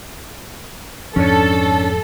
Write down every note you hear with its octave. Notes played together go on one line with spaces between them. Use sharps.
F2 G#2 F3 C#4 D4 A4 C#5